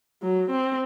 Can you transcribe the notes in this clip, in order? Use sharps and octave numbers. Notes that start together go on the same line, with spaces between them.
F#3
C4